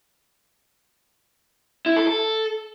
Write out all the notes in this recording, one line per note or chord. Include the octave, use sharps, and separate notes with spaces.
E4
A4
A4